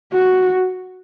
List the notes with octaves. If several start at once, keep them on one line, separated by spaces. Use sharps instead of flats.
F#4